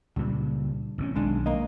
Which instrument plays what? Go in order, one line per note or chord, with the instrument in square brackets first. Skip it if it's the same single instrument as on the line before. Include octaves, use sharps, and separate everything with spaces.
[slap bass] C#2 A#2 [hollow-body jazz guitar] G2
[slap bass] A1 C3 C#4
[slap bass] B1 D#3 [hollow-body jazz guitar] G#3 D4
[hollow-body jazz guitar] A#3 D#5